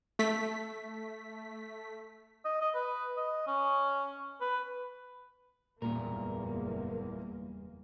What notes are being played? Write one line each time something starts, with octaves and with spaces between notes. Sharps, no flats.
A3 B6
D#5
D#5
B4
D#5
C#4
B4
F#1 E2 G2 A#2 A#3 A#4